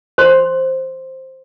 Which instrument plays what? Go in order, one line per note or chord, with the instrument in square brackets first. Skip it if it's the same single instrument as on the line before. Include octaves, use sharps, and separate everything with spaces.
[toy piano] C5 C6